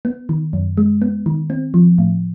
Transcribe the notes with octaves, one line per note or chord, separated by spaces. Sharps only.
B3
D#3
F#2
G#3
B3
D#3
C4
F3
A2